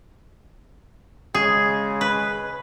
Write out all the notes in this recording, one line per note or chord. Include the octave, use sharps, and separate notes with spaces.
C#3 G#3 G#4
B4